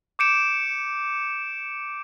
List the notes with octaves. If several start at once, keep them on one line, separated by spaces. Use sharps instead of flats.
D6 G6 C#7 D7 E7